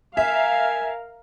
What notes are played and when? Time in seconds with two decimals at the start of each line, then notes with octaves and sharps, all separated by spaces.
0.17 A#4 E5 F5 G#5